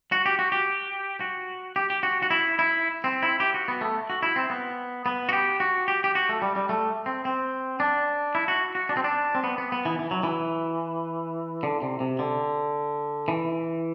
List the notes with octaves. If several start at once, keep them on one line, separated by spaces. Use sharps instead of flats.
F#4
G4
F#4
G4
F#4
G4
G4
F#4
F#4
E4
E4
C4
E4
G4
F#4
B3
A3
F#4
E4
C4
B3
B3
F#4
G4
F#4
G4
G4
F#4
A3
G3
G3
A3
C4
C4
D4
E4
F#4
F#4
D4
C4
D4
C4
B3
B3
B3
E3
E3
F#3
E3
D3
C3
C3
D3
E3